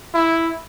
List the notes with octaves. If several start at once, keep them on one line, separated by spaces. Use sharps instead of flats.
E4